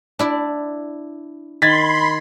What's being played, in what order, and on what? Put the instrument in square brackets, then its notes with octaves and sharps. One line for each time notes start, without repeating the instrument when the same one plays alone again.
[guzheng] D4 E4 D5
[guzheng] D#3 [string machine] B5 C6 [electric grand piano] G#6 A6 B6